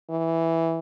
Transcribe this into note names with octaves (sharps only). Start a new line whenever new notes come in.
E3